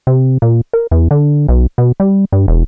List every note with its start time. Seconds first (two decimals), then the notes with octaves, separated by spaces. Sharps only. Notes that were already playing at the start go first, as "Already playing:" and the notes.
0.07 C3
0.42 A#2
0.73 A#4
0.91 E2
1.11 D3
1.49 B1
1.78 B2
2.00 G3
2.32 G2
2.48 E1